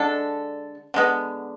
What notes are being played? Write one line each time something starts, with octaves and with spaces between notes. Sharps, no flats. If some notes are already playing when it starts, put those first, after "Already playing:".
Already playing: D3 G#3 D4 A4
D3 G#3 B3